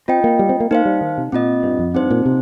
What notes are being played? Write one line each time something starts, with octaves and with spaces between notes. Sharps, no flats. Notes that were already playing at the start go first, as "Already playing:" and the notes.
C4 F4 D#5 G5
A#3
G3
C4
A#3
A#3 D#4 C5 F5
G3
D#3
C3
A#2 C4 F4 D#5
G2
F2
G2 C4 D#4 C5
A#2
C3